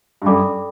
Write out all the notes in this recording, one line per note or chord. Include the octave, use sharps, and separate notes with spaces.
G2
F#2 A4 D5 G5 B5 D6